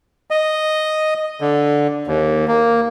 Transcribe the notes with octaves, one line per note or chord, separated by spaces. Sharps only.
D#5
D3
D#2
A#3